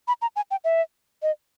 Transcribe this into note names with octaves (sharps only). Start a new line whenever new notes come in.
B5
A#5
G#5
G5
E5
D#5